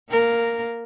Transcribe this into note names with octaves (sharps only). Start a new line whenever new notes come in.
A#3 A#4